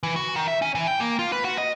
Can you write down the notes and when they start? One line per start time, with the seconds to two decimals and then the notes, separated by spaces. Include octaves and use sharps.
0.03 E3
0.16 F#4
0.36 D#3
0.48 E5
0.62 C#4
0.75 E3
0.87 G5
1.00 A#3
1.19 F4
1.32 B4
1.45 F#4
1.58 D#5